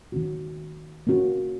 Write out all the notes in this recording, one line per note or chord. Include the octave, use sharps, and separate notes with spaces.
D#3 A#3 C#4 F#4
A#3 C#4 F#4